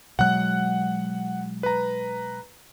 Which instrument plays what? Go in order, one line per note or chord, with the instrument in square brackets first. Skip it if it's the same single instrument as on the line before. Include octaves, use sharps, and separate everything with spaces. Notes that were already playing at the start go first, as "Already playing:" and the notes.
[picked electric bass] B2 F#3 G#3 [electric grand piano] F#5 F#6
[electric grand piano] B4 A#5